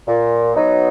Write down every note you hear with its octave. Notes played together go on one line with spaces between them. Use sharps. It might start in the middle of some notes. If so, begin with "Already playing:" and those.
A#2
F#3 B3 D#4